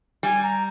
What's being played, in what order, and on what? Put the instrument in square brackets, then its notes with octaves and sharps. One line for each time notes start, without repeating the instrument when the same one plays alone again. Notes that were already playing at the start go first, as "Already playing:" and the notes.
[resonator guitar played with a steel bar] G3 [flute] G#5
[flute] A#5